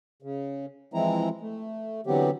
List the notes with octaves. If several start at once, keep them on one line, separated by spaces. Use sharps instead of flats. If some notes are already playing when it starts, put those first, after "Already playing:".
C#3
E3 F3 G#3 C4 E4 A#5
A3
D3 E3 F#3 B3 C4 G4